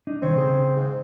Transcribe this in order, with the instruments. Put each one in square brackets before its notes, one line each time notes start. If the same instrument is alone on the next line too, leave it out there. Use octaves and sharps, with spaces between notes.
[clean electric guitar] D4 D#4
[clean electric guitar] C2 D#3 C#5 [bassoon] C4
[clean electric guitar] C#3 G#4 C5
[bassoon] G#2